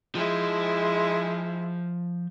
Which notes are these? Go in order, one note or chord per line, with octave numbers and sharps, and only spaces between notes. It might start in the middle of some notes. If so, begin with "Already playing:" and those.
F3 G#3 E4